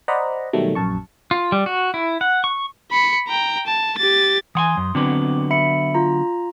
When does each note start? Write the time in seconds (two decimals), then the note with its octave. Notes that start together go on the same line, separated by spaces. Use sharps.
0.08 C5 D5 D#5 F#5 A#5 B5
0.53 B2 D#3 F#3 G3 A3
0.75 A#1 F#2 A5 C#6
1.31 F4
1.52 G3
1.66 F#4
1.94 E4
2.21 F#5
2.44 C#6
2.92 B5 C#7
3.28 G5 A#5
3.67 A5
3.98 G4 A6
4.55 E3 F#5 G#5 C6 D#6
4.77 F#2
4.95 D3 F#3 B3 C4 D6
5.51 E5 B5 C#7
5.95 F4 A#5